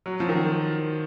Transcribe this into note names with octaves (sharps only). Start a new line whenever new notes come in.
F#3
F3
D#3